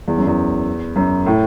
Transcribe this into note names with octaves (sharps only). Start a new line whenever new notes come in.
E2
F#2
E2
F#2
A2